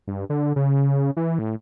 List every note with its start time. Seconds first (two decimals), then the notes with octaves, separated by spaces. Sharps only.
0.08 G2
0.30 D3
0.56 C#3
1.17 E3
1.39 A2